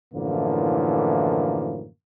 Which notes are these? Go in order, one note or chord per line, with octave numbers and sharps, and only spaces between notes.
F#2 A2 D3 E3 F3 A#3